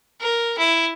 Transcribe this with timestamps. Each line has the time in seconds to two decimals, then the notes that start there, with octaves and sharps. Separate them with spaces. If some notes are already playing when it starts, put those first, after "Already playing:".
0.21 A#4
0.59 E4